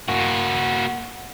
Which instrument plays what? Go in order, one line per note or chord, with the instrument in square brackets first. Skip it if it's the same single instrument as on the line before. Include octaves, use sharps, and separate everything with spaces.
[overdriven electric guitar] A#3 F#4